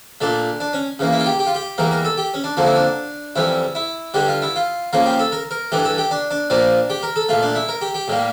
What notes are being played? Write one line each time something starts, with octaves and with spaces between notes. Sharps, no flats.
A#2 A3 D4
D4
C#4
C#3 E3 A#3
E4
F4
G4
G4
F4
G4
E2 E3 G3 A#3 A#4
A#4
A4
G4
C#4
D4
F2 D3 F3 A#3 D4
E4
D4
F2 E3 G3 E4
E4
G2 D3 G3 G4
F4
E4
F4
C#3 F3 A#3 F4
G4
A4
A#4
A#4
G2 E3 A3 G4
A4
G4
D4
D4
A#2 F3 A#3 D4
G4
A#4
A4
A#2 A3 F4
D4
E4
A#4
G4
G4
A2 G3 A#3